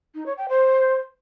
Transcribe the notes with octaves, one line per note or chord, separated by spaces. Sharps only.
D#4
C#5
G5
C5